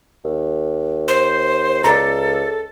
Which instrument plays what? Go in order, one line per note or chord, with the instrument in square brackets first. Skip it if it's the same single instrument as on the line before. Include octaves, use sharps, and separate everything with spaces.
[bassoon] D#2
[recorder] C5
[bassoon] C#2 [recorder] A4 [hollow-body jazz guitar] D5 A#5